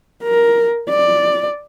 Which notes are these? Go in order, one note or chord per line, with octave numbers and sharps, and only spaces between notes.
A#4
D5